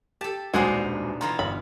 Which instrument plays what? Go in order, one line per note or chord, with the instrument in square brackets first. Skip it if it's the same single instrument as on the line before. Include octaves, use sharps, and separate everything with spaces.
[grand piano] G4 [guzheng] A4 A5
[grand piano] D#1 C2 C5 [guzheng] B2 D4 D#4 [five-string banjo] G#3 F#4
[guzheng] E3 B3 F4 [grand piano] A#5
[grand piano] G1 [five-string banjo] B5